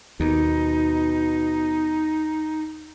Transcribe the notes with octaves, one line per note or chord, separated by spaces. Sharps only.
D#2 B2 D#4